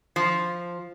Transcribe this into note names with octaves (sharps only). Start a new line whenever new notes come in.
F3